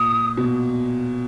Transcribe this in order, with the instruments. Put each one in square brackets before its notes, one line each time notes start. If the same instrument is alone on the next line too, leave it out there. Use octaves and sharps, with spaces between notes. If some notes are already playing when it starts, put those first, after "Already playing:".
Already playing: [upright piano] A#2 [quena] D#6
[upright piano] B2